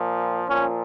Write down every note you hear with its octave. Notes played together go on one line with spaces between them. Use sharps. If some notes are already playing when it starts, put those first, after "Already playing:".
Already playing: A#2 F3
A#2 F3 C#4